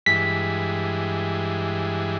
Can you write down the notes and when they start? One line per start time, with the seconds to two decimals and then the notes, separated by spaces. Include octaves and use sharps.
0.06 G2 E3 G#3 B6